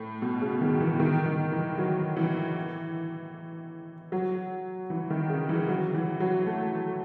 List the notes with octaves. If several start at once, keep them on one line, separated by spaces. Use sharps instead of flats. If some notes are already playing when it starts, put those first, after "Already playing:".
Already playing: A2
B2
C#3
D#3
E3
D#3
D#3
E3
F#3
E3
F#3
E3
D#3
C#3
E3
F#3
E3
F#3
A3